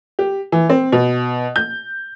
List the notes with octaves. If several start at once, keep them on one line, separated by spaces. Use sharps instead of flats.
G4
E3
C4
B2
G6